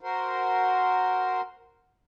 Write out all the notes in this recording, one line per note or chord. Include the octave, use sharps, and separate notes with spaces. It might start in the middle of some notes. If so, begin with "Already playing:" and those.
F#4 A#4 C5